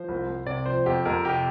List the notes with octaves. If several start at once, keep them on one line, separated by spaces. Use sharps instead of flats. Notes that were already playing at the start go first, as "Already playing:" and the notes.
Already playing: F3 C5
C2
C2
C3 D5
F3 C5
F2 G4
F2 A#4
C3 G4